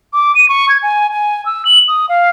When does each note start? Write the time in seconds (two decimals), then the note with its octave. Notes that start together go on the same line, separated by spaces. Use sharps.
0.13 D6
0.35 D#7
0.49 C#6
0.69 G#6
0.83 G#5
1.12 G#5
1.46 E6
1.65 F#7
1.88 D#6
2.09 F5